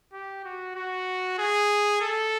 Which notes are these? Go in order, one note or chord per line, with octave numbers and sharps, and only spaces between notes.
G4
F#4
F#4
G#4
A4